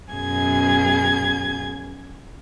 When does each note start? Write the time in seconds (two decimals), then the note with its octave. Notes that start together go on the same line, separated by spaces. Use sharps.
0.12 F#2 B2 G#4 G#6